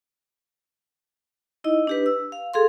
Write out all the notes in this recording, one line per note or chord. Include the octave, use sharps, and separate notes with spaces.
D#4 E4 D#5
D4 G4 B4
E6
F5
G#4 A4 F5 C6